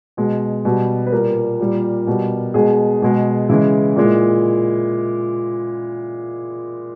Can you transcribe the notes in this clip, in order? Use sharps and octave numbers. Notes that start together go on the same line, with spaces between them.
B2 G#3
B2 G3
B4
A#2 G3 A#4
A#2 G3
B2 G3
B2 G#3 G#4
B2 G#3
C#3 E3 G#3 E4
A#2 G#3